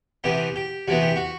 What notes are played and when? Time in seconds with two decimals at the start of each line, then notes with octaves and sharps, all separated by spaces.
0.24 C3 E3 B3 G4
0.56 G4
0.88 C3 E3 B3 F#4
1.02 G4
1.16 F#4